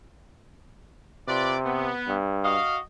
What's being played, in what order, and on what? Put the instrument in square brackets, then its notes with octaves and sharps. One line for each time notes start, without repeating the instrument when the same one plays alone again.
[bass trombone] C3 [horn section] F4 B4 D5
[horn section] B3
[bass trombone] G2
[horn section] F#4 D#5 F5